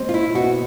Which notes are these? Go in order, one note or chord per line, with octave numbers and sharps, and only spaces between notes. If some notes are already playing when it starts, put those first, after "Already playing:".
Already playing: G#3 C4
F4
E4
B2 F#4